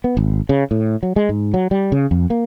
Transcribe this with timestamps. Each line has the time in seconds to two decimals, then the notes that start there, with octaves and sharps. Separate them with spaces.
0.04 B3
0.17 G#1
0.49 C#3
0.71 A2
1.03 F#3
1.16 G#3
1.29 G#2
1.54 F#3
1.71 G3
1.92 C#3
2.11 F2
2.30 A#3